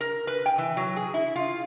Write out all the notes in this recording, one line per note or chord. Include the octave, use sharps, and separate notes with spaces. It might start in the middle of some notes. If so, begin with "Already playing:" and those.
A#4
B4
G5
E3
F#3
G#4
E4
F4